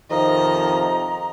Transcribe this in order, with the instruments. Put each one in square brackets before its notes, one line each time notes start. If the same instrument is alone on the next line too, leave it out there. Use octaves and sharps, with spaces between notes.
[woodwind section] F2 C3 F3 [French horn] D#3 [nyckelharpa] D#5 [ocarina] A#5